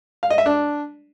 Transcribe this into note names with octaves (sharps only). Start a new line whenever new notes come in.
F5
D#5
E5
D4